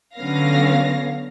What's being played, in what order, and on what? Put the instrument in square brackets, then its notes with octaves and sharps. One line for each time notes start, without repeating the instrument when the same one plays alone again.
[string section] D3 F#3 B3 C#4 F5 A#6